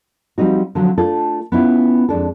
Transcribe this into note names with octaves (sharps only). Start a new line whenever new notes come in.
F3 G3 C4 D#4 F#4
D3 F3 F#3 C4
A3 D4 F4 A4
B3 C#4 E4 F4
F2 G#3 D4 A4